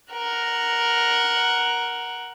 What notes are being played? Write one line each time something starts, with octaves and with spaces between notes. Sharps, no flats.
A#4 F#5